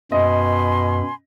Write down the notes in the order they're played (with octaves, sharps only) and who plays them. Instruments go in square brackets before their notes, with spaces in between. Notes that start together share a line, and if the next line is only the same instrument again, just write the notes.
[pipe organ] F#2 [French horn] B2 [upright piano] D#5 [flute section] G#5 B5 C6